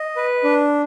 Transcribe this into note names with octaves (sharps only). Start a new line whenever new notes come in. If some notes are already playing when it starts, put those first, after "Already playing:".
Already playing: D#5
B4
D4